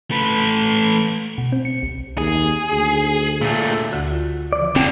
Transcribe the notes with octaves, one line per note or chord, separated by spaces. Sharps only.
A3 B4
B2
C4
C#7
C2
D#2 G#4
D2
A#2 A3
D2 D3 F#4
F4 F#4
C#3 E3 F3 D5
F2 D3 C4